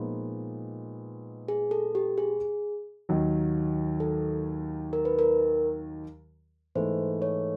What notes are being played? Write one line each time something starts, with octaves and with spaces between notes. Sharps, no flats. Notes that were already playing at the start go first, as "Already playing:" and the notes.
Already playing: A#2 F3 G#3 B3 D#4
G#4
A4
G4
G#4
D#2 D#3 F#3
A4
A#4
B4
A#4
G#2 E3 A3 C5
C#5